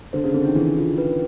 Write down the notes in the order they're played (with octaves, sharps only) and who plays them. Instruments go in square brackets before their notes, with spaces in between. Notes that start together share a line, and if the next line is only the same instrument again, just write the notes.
[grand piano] D3 [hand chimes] C5
[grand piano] C#3
[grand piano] D3 [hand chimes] C4
[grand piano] D#3
[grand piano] E3 [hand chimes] G#4
[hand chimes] F4
B4